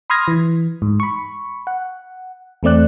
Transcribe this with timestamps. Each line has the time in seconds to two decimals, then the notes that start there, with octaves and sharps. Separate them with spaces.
0.10 B5 C6 D#6 F6 G#6 A#6
0.28 E3
0.82 G#2
1.00 B5 C#6
1.67 F#5
2.63 E2 A3 C4 D5 F#6